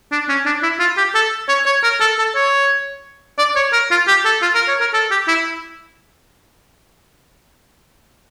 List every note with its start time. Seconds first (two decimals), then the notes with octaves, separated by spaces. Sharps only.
0.12 D4
0.29 C#4
0.46 D4
0.63 E4
0.80 F4
0.97 G4
1.15 A4
1.48 C#5
1.66 C#5
1.84 A#4
2.00 A4
2.19 A4
2.35 C#5
3.38 D5
3.56 C#5
3.73 A#4
3.91 F4
4.08 G4
4.25 A4
4.42 F4
4.55 A#4
4.68 C#5
4.80 A#4
4.94 A4
5.11 G4
5.28 E4